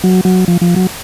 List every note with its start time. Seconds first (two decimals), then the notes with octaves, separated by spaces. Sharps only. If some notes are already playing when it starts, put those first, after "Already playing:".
0.04 F#3
0.25 F#3
0.48 F3
0.61 F3
0.76 F#3